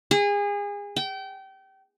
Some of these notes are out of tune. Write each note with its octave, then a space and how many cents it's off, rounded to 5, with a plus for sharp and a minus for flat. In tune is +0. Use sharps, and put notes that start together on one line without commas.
G#4 -30
G5 -30